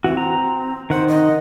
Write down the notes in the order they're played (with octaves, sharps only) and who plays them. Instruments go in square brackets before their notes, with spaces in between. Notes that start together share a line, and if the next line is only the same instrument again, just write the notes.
[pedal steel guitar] E3 F#4 [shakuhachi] C4
[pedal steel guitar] A#5
[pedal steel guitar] D#3 F#5 [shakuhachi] C5
[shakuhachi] D#5